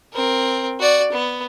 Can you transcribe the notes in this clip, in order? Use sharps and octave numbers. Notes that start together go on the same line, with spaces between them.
C4 A#4
F#4 D5
B3